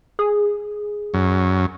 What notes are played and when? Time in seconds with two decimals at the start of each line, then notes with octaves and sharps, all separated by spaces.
0.19 G#4
1.14 F#2